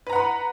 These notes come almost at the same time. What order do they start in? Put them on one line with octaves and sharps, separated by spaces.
B4 A#5 F#5 B5